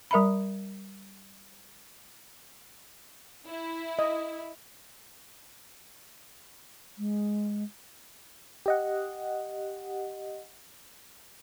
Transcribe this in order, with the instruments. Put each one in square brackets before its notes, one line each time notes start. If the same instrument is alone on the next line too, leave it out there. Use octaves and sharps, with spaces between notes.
[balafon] G3 A#4 E5 A#5 B5
[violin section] E4
[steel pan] D#5
[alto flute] G#3
[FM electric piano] G4 D#5 F#5